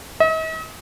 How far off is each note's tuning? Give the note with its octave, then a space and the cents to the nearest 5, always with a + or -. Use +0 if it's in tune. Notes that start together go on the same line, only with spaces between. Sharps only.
D#5 +45